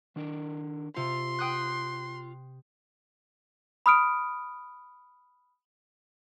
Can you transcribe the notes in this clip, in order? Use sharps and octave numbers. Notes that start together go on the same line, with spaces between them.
D#3 D4 A#4
C3 F4 C6
G5 D#6 F#6
B5 D#6 F6 D7